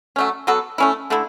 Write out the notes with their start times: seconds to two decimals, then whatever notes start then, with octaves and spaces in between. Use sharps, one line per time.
0.16 F#3 A3 C#4
0.47 F#3 B3 F#4 A4
0.78 A3 C#4 E4
1.10 D3 A3 E4